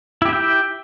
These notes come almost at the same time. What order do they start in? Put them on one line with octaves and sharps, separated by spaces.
E4 G4 E5 G5